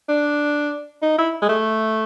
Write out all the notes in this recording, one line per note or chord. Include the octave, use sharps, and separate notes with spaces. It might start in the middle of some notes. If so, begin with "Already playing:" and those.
D4
D#4
E4
G#3
A3